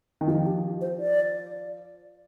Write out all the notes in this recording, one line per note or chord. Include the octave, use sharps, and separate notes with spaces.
D#3
F3 D#4
G4
C5
D5